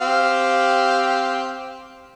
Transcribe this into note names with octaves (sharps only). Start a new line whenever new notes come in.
C4 G4 F5